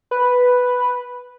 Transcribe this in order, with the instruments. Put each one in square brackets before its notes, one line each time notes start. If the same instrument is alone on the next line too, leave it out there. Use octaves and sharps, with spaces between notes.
[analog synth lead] B4